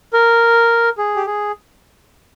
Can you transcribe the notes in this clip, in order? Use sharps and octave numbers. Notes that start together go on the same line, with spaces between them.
A#4
G#4
G4
G#4